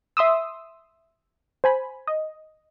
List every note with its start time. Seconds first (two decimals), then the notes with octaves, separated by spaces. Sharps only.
0.17 E5 C6 D#6 E6
1.64 C5 G#5 B5
2.07 D#5